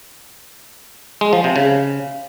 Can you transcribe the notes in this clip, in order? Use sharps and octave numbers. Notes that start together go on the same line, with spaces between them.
G#3
F3
C3
C#3